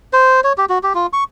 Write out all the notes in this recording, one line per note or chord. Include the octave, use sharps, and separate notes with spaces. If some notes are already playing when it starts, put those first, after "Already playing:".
C5
C#5
G4
F#4
G4
F4
C#6